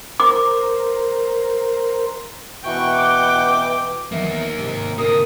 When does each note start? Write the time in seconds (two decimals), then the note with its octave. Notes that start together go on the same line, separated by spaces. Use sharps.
0.20 A#4 C5 D6
2.65 B2 E3 F#5 G5 C#6
2.95 D6
4.12 E2 D#3 F#3 A#3 E5
4.59 G#2 C3
4.98 D3 A#3 A#4 D#6